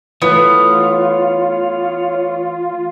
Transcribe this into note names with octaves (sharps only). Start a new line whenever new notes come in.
E3 A3 B3 F4 C#5 F5